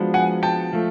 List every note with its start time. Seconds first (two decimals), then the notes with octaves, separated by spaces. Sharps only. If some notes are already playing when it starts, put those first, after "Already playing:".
Already playing: F3 G#3 B3 D4 F#4
0.14 F#5 G#5
0.43 G5 A5
0.73 F3 A3